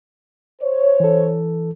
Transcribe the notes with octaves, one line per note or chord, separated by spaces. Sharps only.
C5 C#5
E3 A4